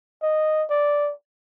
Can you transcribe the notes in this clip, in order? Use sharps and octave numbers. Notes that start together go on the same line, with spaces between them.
D#5
D5